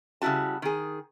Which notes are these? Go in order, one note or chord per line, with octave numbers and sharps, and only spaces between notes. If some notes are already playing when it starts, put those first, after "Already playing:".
C#3 G3 E4 F#4 A5
D#3 G#4